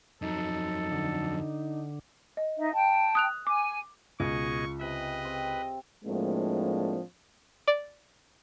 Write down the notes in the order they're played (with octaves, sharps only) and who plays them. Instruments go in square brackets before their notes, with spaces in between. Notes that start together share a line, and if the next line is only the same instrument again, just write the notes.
[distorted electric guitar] F2 F#3 [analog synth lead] D#4 [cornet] A4
[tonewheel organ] D3
[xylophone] D#5
[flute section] D#4 E5
G5 A5
[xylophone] D#6 F#6 F7
[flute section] G#5 [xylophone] D6
[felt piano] C#2 [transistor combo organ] B2 G#4 D#5 [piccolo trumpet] C#6
[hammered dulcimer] C3 [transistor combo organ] B4 [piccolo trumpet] D#5
[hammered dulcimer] C4
[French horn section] A2 F3 G#3 A#3 C4 D4
[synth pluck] D5